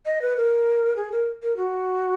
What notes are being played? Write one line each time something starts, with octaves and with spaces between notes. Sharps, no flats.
D#5
B4
A#4
G#4
A#4
A#4
F#4